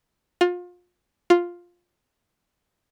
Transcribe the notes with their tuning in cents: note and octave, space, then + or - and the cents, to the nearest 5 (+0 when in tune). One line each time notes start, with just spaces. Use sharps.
F4 +30
F4 +5